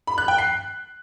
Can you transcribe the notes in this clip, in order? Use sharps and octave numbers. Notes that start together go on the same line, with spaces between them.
B5
F#6
G5
C7